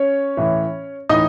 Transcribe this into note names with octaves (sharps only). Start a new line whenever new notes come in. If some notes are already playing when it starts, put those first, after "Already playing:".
Already playing: C#4 C#5
A2 E3
A2 E3 D#4 D#5